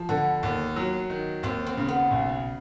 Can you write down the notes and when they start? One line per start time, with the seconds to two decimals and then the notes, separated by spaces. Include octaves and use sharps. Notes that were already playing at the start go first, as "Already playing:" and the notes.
Already playing: F3
0.09 D3 B3
0.43 D#2
0.76 F#3
1.10 D#3
1.43 D#2 C4
1.66 C4
1.77 C#3
1.88 B3
2.11 B1